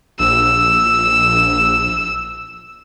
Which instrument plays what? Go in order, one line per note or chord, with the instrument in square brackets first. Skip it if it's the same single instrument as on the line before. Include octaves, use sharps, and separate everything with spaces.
[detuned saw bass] A#1 [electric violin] E6